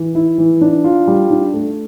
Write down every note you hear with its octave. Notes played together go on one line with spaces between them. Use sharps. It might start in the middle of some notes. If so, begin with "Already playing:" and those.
Already playing: E3
E4
E3
D4
F4
G3
D4
A3